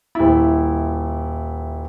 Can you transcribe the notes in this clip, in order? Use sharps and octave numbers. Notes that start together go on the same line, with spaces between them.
D#1 E4